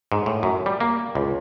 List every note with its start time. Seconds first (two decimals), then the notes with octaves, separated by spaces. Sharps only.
0.12 G#2
0.26 A2
0.43 F#2
0.66 G3
0.81 A#3
1.15 C#2